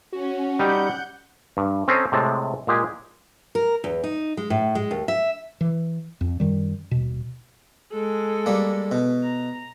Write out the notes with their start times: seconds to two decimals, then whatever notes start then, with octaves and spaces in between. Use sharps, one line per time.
0.12 C#4 F#4
0.59 G3 D#4 G4 F#5 G6
1.57 G2
1.88 C4 C#4 A4 C5 D#5 A#5
2.12 A2 C3 G#3 A5
2.67 A#2 G#3 G4 G#4
3.55 A#4
3.84 E2
4.04 D#4
4.37 G#3
4.50 A2
4.75 G#3
4.91 D#2
5.08 E5
5.61 E3
6.21 F2
6.40 F#2 D#3 G3
6.91 D#1 B2
7.92 G#3 A4
8.46 G3 A#3
8.91 B2
9.24 A#5